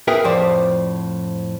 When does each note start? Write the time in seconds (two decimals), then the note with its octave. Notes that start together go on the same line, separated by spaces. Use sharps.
0.08 G#4 A#4 B4 E5 F5 G5
0.24 F2 A2 F3 C5 D5